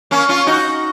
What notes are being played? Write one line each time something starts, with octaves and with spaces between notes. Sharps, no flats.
A#3 C#4
C#4 F4
D#4 F#4